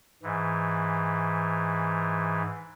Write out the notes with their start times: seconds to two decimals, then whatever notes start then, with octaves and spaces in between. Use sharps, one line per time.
0.23 G#2 E3